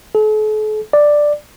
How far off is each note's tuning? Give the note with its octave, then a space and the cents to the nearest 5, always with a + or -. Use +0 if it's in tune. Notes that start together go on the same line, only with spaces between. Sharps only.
A4 -45
D5 +5